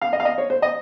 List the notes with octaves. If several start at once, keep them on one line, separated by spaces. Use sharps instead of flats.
F5
D#5
F5
D#5
C#5
C5
D#5